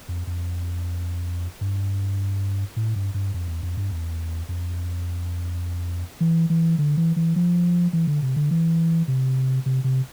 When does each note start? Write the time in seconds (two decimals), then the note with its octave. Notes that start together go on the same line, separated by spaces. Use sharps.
0.09 F2
0.27 F2
1.61 G2
2.76 A2
2.96 G2
3.14 G2
3.34 F2
3.48 E2
3.63 F2
3.77 G2
3.91 E2
4.49 F2
6.20 E3
6.50 E3
6.78 D3
6.97 E3
7.16 E3
7.36 F3
7.93 E3
8.07 D3
8.22 C3
8.36 D3
8.51 E3
9.08 C3
9.66 C3
9.84 C3